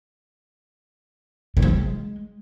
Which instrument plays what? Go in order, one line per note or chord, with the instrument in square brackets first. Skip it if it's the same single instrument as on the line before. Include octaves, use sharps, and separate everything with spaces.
[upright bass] D#3
F3
G#3